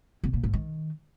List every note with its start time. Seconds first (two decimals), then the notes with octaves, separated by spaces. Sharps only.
0.24 C3
0.33 A#2
0.43 G#2
0.53 D#3